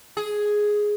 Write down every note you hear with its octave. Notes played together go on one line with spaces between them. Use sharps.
G#4